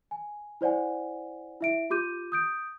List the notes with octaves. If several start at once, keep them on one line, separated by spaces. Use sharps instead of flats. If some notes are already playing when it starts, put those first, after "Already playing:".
G#5
E4 C5 D5 F#5 G#5
E4 E5 D7
F4 G4 D6 G6 D#7
D#6 G6 D7